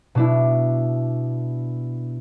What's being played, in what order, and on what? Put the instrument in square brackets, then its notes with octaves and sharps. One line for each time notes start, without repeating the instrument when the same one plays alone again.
[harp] B2 D4 E4